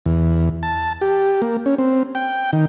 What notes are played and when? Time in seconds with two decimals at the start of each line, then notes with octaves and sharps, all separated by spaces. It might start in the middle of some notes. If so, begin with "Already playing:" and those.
0.06 E2
0.63 A5
1.01 G4
1.42 A#3
1.66 C#4
1.78 C4
2.15 G5
2.53 D#3